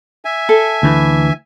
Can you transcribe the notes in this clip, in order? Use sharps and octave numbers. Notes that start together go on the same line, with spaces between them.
E5 G#5
A4
D2 E3